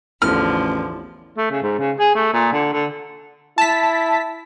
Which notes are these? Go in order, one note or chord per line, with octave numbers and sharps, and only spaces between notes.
A1 E2 D3 F3 F6
A3
C#3
G#2
C#3
G#4
A3
A#2
D3
D3
E4 A5 B6